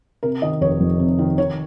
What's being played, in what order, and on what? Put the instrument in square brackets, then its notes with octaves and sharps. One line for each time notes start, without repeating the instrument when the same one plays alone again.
[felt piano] C3 A#4
D#3 D#5
F1 C#5
F2
C3
D#3
D#3 C#5